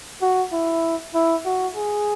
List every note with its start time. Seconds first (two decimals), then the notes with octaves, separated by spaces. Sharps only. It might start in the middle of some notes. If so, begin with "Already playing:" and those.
0.22 F#4
0.52 E4
1.14 E4
1.45 F#4
1.76 G#4